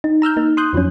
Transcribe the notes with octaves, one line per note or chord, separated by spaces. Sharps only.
D#4
A#5 E6 F6 G6
A#3 D#4
C6 D#6 F#6 G6
F2 F3 F#3 C#4